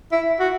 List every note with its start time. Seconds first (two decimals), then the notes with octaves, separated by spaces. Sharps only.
0.12 E4
0.40 F#4